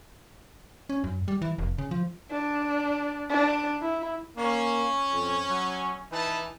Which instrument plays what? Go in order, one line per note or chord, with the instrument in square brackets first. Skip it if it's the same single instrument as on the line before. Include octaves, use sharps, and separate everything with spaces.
[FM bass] C#4
F#2
G3
E3
F1
C#3
F3
[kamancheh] D4
D4
E4
[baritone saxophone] A#3 [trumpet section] C#4
[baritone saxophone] F2
F#3
[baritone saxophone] E3 [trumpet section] D#4 B4 A5